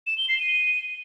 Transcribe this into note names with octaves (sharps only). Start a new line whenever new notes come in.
E7
G7
C7
D#7